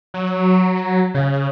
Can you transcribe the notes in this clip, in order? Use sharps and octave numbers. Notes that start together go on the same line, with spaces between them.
F#3
C#3